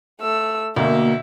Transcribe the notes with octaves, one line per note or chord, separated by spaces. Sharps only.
A3 E6
D2 B2 A#3 E5